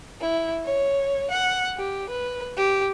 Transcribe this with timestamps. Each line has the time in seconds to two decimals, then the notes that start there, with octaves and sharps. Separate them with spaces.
0.21 E4
0.65 C#5
1.31 F#5
1.77 G4
2.10 B4
2.57 G4